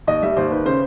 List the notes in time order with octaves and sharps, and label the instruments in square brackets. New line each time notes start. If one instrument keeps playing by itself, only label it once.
[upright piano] D#2 D#5
G3 E5
D#2 C5
D#3 B4
C#3 C5